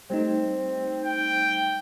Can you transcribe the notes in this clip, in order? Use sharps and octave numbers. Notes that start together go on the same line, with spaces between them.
G3 A3 C4 D#4
G5